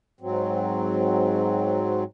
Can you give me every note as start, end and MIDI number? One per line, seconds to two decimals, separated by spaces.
0.21 2.04 44
0.21 2.04 54
0.21 2.04 60